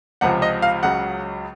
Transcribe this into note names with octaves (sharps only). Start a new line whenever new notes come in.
C#2 C3 F3 F#5
D#5
F5
C#2 C#3 F#3 F#5